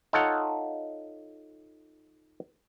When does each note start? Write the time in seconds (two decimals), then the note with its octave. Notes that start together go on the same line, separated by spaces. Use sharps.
0.13 D#4 F4 A4 C#5 F#5